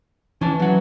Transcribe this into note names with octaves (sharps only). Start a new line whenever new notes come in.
E3 C#4 A5
F#3 F#5